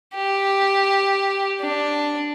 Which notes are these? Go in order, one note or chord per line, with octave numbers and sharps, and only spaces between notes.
G4
D4